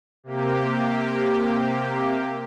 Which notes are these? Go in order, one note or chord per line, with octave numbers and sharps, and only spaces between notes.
C3 A#3 G4